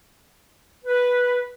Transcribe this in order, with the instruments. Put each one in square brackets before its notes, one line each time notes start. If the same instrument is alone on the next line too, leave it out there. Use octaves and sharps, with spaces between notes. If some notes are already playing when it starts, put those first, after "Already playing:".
[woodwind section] B4